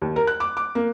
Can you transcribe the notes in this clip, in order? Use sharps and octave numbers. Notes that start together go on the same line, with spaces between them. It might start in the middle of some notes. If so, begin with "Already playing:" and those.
D#2
A#4
F#6
D6
D6
A#3